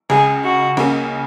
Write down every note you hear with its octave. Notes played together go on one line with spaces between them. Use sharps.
C#2 C#3 G#3 G#4
F#4
C#2 C#3 A#3 C#4